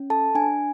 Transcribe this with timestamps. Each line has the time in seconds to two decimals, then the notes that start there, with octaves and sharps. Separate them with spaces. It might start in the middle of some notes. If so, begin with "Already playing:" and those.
Already playing: C#4
0.10 A4 A5
0.35 D4 G#5